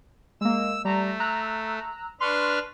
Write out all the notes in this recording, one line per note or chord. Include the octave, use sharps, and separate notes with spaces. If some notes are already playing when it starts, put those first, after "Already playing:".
G#3 A#3 E6
G3 A3 A#5
A#5 E6 F#6
D4 B4 C6 C#6 F6